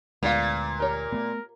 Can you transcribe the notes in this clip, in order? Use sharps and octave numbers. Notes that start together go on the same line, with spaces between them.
D2 A#2 G#3 B3 F4 F5
G4 A#4 C#5
A3 B3